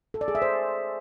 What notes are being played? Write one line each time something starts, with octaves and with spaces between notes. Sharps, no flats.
A4
D5
G#4
E5
C5